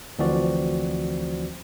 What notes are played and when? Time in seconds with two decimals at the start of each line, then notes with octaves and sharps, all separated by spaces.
0.19 D2 E3 F3 C4 F#4 D5